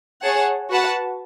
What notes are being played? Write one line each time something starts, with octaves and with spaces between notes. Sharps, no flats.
G#4 C#5 F#5 A5
F#4 B4 F#5 A5